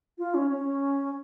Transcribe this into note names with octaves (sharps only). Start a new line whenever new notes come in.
F4
C#4
C#4